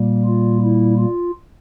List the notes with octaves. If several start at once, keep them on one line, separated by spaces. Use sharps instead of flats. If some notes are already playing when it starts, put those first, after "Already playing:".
Already playing: A#2 G3 A#3
F4
E4
F4